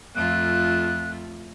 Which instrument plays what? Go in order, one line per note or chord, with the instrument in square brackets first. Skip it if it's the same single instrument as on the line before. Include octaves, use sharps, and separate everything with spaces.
[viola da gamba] F2 A3 F4 [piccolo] F#6